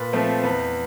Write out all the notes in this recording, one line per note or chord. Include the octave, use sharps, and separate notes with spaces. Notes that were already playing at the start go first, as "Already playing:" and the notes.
Already playing: A#2 B4
F3 A3 C4
E2 B4